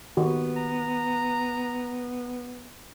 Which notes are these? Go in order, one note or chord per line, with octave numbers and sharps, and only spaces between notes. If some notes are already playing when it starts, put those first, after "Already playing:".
D#3 B3 F#4 G4
A#5